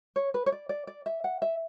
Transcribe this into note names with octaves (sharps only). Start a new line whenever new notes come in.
C#5
B4
C#5
D5
D5
D5
E5
F#5
E5